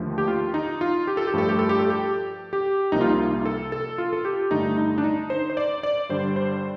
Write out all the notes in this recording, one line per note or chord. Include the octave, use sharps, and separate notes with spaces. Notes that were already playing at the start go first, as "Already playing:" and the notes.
Already playing: D#2 D3 F3 A3
G4
F4
D#4
F4
G4
A4
G4
G2 F3 A3 A4
G4
A4
G4
A4
G4
G4
C2 C3 F3 A#3 D#4
F4
D#4
F4
A4
A4
F4
A4
G4
G2 D3 A3 D#4
D#4
D4
D#4
C5
C5
D5
D5
G2 D3 G3 C5
C5